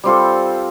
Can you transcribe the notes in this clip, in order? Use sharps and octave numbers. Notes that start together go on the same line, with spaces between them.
G3 C4 F4 A4